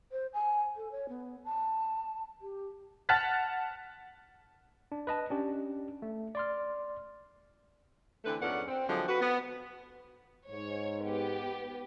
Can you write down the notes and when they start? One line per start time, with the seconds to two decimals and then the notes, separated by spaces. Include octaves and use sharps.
0.12 C5
0.33 G#5
0.76 A4
0.91 C#5
1.09 B3
1.45 A5
2.41 G4
3.09 F#5 A5 F6 F#6 A6 B6
4.92 D4
5.07 B4 D#5 A5
5.30 C#4 D4 G4
6.02 A3
6.35 D5 C6 F6
8.24 D3 E3 A3 C4 B4
8.40 F2 G#2 B3 C#4 D4 F#5
8.68 C4
8.87 D3 F3 F#3 G#3 C4
9.08 F#4 B4
9.21 B3
10.50 G#2 C#5
11.04 B3 G4